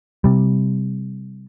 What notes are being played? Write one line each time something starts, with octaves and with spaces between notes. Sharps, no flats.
C3 G3